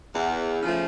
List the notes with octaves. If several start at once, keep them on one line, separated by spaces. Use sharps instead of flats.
E2
C#3 F3 A3